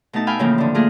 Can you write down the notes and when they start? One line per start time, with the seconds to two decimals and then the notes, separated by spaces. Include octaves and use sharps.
0.13 B2 A3 D#4 A5
0.27 F5 G5 G#5 B5 E6
0.39 A2 C#3 E3 F3 A#3 C4
0.58 D3 D4
0.75 A3 A#3 F4 G#4 A#4